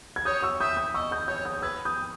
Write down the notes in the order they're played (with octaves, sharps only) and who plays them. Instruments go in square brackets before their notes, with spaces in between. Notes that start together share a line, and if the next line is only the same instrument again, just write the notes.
[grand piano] G#6
[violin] C#5 [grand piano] D#6 G6
[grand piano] C#6 E6
[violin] E5 [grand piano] D#6 G6
[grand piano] D#6 G6
[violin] D#5 [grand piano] C#6 E6
[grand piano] D#6 G6
[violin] C#5 [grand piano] D#6 G6
[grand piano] D#6 G6
[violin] B4 [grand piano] E6 G#6
[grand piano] D#6 G6